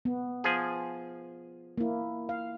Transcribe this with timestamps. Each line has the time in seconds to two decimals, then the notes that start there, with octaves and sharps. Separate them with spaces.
0.05 B3
0.44 F3 G#4
1.78 A#3 E4
2.29 F5